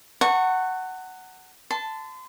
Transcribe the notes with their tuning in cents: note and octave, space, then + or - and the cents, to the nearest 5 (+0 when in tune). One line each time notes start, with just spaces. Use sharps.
F#5 +10 A#5 -45 C#6 -10
A5 +0 C6 -35